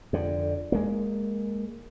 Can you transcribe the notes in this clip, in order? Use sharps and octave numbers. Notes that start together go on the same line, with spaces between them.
F2 D3
G#3 A#3